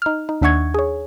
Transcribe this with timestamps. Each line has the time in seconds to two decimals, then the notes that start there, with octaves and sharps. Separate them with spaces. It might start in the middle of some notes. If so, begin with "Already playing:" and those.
0.02 D#4 F6
0.29 D#4
0.41 D#2 D4 E5 F#5 C#6 G#6
0.74 G#4 C#5